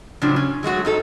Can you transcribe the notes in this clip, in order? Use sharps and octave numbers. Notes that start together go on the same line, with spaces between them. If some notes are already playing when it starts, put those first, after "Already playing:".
A2 C#3 F3 F#3 D4
C#4
F#3 G#3 A3 F#4
G#2 D#4 A4